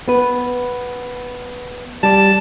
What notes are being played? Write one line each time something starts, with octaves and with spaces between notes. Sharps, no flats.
B3 B4
G3 D5 A5